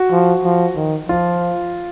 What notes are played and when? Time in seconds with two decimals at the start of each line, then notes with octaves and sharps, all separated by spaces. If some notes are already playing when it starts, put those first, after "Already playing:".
Already playing: F#4
0.11 F3
0.44 F3
0.76 D#3
1.09 F3 F4